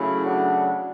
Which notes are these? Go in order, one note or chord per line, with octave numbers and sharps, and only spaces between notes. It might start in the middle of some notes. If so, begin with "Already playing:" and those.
Already playing: C#3 F#3 A3 C#4 E4
D4 F#4